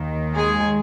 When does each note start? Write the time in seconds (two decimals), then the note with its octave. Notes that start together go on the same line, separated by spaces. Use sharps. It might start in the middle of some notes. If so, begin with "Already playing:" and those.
Already playing: D#2 D#3
0.34 G#3 G#4